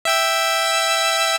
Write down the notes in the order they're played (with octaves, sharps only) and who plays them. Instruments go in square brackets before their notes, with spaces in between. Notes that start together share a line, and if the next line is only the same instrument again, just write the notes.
[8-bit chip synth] E5 G5 E6